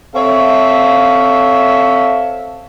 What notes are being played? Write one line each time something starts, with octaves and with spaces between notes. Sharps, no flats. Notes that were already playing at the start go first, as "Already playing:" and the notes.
C4 A4 C#5 E5 F5